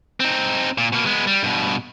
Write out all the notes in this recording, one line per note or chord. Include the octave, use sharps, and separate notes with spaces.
C4 D#4
A#2
B2 A#3
G#3 B3
G3
G2 B2